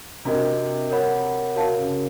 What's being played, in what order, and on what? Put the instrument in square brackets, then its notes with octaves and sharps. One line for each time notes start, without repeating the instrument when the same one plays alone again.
[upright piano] C3 [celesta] D4 F#4 A#4 D#5
[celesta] A#4 C#5 F#5 B5
[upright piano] C3 [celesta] F#4 A#4 C#5 F5 A5
[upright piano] C#3